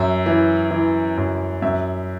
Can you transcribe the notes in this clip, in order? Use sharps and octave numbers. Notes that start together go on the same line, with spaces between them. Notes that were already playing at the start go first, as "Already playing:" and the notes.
Already playing: F#2 E5
E3
E3
F#2
F#2 E5